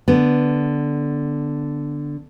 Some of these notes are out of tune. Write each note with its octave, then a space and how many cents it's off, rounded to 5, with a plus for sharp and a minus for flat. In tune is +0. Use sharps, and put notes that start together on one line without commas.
D3 +0 B3 +0